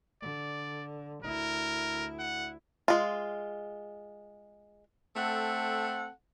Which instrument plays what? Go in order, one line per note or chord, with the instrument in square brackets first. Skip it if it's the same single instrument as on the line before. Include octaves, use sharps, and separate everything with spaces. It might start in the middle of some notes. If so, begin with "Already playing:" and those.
[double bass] D3 [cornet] D5
[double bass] D2 E4 [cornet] A#4
[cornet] F#5
[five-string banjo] G#3 F4
[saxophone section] A3 C4 A4 F#5